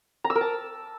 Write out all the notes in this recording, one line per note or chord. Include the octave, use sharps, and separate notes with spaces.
A#5
E6
A#4
A5